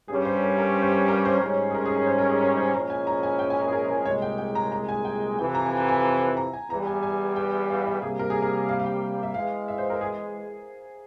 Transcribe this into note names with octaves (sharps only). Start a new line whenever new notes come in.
G2 G3 C#4 G#4
C5
A#4
A#4
C5
A#4
A#4
C5
G#2 G3 C#4 C5
G#4
A#4
G#4
A#4
C5
A#4
G#4
A#4
C5
A#2 F3 G#3 C#4 E4 A#5
G#5
A#5
G#5
G5
G#5
A#4
G#4
A#4
A#4
C2 A#2 G#3 C#5
G5
G5
A#5
A#5
G#5
G5
F2 C3 E3 G5
A#5
G#5
G5
G#5
A#5
G#5
E2 E3 G3 A#5
G#5
G#5
G5
F5
E5
C3 G3 A#3 G#4
A#4
G#4
A#4
F5
F5
G5
E5
E2 E3 G#3 F5
E5
C5
A#4
G#4